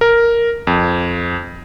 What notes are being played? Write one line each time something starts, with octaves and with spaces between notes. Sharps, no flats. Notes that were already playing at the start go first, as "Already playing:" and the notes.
A#4
F2